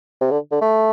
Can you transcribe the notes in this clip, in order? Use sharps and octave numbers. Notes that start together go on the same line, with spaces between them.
C3
D3
D3
A3